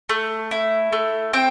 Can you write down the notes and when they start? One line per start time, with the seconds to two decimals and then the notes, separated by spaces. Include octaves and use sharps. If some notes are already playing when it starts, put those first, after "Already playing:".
0.09 A3
0.51 E4
0.92 A3
1.33 C4 G5